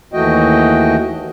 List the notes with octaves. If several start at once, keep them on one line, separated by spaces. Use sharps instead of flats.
D#2 E3 A3 F#4 D#5 G5